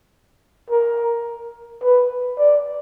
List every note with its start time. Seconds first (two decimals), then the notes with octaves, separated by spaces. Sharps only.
0.70 A#4
1.84 B4
2.39 D5